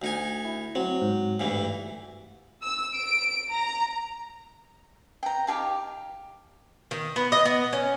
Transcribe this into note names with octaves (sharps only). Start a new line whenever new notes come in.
D2 D#4 G#5
E4
F#3 C4
G#2
D2 G2 E3
E6
D7
A#5
G5 A#5
D#4 G4 G#4 F5
D#3
B3
D#5
B3
C#4